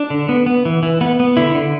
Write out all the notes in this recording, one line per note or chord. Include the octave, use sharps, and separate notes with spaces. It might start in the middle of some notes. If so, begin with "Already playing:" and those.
Already playing: D4
D3
B3
B3
E3
E3
B3
B3
D3 E4
D3